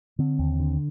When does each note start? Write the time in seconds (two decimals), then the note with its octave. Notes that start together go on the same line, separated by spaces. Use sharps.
0.19 D3 C4
0.39 D#2
0.60 D3